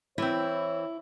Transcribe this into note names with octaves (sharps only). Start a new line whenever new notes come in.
E3 C4 E4 C#5